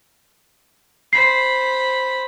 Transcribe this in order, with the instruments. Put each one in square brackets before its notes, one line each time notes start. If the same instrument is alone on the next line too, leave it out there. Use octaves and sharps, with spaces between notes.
[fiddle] C5 B5 [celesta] C7